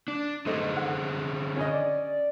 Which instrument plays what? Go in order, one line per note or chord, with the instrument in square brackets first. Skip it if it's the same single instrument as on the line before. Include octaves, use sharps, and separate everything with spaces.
[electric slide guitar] D4
[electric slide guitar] D3 G#4 C5 [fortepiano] A3 D#5
[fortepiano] F#5
C#4 D#5
[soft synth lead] D5